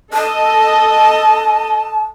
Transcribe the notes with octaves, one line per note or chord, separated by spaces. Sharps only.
A4 D#5 A5